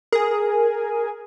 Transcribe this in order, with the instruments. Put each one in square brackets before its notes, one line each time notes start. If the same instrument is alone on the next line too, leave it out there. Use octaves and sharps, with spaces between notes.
[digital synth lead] G#4 [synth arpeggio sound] A#4 G#5